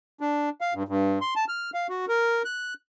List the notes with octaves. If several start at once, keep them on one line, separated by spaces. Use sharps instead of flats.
D4
F5
G2
G2
C6
A5
F6
F5
F#4
A#4
F#6